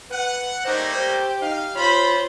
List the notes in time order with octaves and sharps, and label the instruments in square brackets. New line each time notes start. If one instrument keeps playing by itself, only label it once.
[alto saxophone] B4 [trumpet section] F#5
[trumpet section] G3 A3 A#3 [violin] D#4 A#6 [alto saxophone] C5
[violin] G4 [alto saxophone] C5
[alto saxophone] D#4 [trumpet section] F5
[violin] F4 C5 [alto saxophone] C#5 [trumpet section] B5